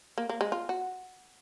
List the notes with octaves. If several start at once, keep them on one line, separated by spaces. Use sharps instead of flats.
A#3
A#3
G#3
F4
F#4